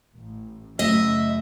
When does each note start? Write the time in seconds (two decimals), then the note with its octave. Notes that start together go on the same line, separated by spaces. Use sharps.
0.15 A1
0.79 F#2 C#3 A3 D#5 E5